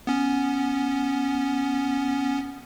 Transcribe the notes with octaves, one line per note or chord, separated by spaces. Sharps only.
B3 C#4